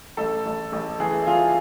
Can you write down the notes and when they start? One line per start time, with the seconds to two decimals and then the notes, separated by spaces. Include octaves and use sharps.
0.17 A1 A4
0.46 A1
0.72 A1
1.00 E3 G#4
1.27 E3 F4